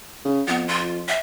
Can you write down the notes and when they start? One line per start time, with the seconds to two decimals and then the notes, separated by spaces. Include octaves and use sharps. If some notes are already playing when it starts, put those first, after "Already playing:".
0.25 C#3
0.48 F2 B3
0.68 F4
1.08 E5